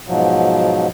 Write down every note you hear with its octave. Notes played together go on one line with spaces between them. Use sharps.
G#2 B2 F3 F#3